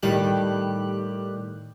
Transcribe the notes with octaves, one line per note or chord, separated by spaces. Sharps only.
A2 D#3 G3 G4 F#6